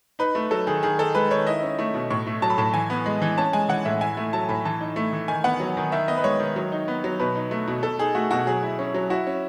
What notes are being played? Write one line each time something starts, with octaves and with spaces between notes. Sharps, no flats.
D#4 B4
A3
F#3 A4
D#3 G#4
D#3 G#4
D#4 A4
G#3 B4
D#3 C#5
E4 D#5
C#4
A3
B2
A2 C#6
A3
F#3 A5
B5
A2 A5
E3 G#5
B3
G#3
E3
C#4 A5
G#3 G#5
E3 F#5
A2 E5
E4 G#5
A3
F#3 A5
A2 B5
E3 A5
D#4
A3
E3
D#3 G#5
B3 F#5
F#3
D#3
D#3 E5
B3 D#5
B4
G#3 C#5
D#3
F#3
D#4
B3
F#3
B2 B4
D#4
A3
B2
B2 A4
D#4 G#4
A3 F#4
B2 F#4
F#3 G#4
E4
C#4
F#3
E4 F#4
C#4